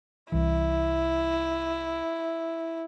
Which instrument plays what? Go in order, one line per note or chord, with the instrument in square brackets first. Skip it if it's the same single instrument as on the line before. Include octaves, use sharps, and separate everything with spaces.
[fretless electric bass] C2 E3 [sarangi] E4